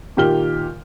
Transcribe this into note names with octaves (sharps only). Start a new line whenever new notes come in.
A#2 D#3 G4 F6 G7